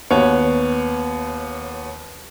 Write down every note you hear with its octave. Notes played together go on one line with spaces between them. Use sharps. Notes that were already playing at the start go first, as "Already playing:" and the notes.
D#2 B3 C#5